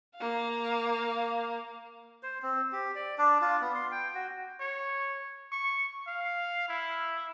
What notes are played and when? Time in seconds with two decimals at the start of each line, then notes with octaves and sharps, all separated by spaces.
0.16 A#3 F5
2.23 C5
2.42 C4
2.72 G4
2.95 D5
3.18 D4
3.41 F4
3.61 B3
3.74 C6
3.92 G5
4.14 F#4
4.60 C#5
5.52 C#6
6.07 F5
6.69 E4